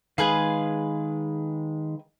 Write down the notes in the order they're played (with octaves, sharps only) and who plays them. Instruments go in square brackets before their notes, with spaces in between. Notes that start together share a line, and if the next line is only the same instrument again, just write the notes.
[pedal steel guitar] D#3 G#3 [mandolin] G#4 B4 F5